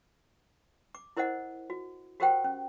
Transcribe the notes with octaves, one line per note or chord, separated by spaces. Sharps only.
D6
E4 A#4 C5 D#5 F#5
F#4
F#4 G4 A#4 C5 F#5 G5
C#4